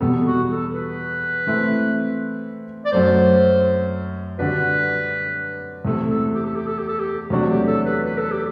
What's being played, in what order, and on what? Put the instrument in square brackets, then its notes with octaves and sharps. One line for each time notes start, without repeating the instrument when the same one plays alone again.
[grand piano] E2 B2 G3 B3 [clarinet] A4
[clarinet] F#4
A4
B4
[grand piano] E3 A3 C4 E4
[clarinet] D5
[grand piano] F#2 F#3 A3 [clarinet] C5
[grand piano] D3 G3 D4 F#4 [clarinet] B4
[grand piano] E2 C3 E3 A3 [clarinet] A4
[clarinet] A4
G4
A4
G4
A4
G4
A4
G4
[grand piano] E2 C3 F#3 A3 D4 [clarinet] F#4
[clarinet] G4
A4
B4
B4
A4
G4